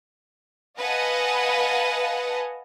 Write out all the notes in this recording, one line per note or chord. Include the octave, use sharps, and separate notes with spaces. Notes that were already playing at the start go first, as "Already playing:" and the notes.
B4 D#5 F5 F#5 G#5 A5